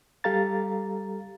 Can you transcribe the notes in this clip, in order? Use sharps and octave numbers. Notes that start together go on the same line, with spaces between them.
G3 G4 A4 F5 A#5 A6